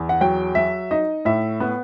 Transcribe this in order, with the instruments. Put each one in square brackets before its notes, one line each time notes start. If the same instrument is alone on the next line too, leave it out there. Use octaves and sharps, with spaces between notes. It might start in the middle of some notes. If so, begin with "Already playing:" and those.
Already playing: [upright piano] E2
F#5
F#3 G5
F#3 E5
D#4 D#5
A2 E5
B3